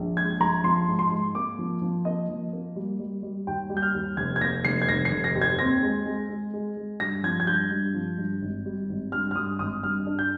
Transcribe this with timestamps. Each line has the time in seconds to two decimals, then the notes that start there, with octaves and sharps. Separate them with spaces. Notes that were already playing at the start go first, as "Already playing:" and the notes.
Already playing: A#1
0.17 G#3 G#6
0.40 A#1 A#5
0.64 F3 C6
0.87 G#2
0.99 C6
1.11 G#2
1.34 A#3 D6
1.59 F3
1.82 F3
2.05 A#3 D#5
2.29 F3
2.53 A#3
2.76 G3
3.00 G3
3.23 G3
3.47 D#2 G5
3.70 G3
3.77 G6
3.82 F6
3.95 D#2
4.17 F1 G#6
4.36 G#6
4.40 A#3 A#6
4.65 F1 C7
4.82 G#6
4.89 F1 A#6
5.05 C7
5.12 F1
5.24 A#6
5.35 D#2
5.42 G#6
5.59 C4 A#6
5.83 G#3
6.06 G#3
6.29 G#3
6.53 G#3
6.77 G#3
7.00 G2 A#6
7.24 F3 G#6
7.40 G#6
7.47 G2 G6
7.71 G2
7.94 F3
8.18 G2
8.42 G#1
8.66 G3
8.89 G#1
9.12 G2 F6
9.31 F6
9.36 G2 D#6
9.59 G#1 D#6
9.83 G2 F6
10.06 D4
10.19 G6